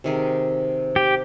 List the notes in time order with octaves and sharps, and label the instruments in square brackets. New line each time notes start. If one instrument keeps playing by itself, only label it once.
[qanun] C3 D#3 G#4
[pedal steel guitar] G4